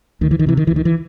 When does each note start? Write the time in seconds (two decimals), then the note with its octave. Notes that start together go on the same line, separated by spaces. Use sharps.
0.21 D2 D#3
0.31 E3
0.39 D#3
0.46 C3 E3
0.57 D#3
0.67 E3
0.71 D2
0.76 D#3
0.85 E3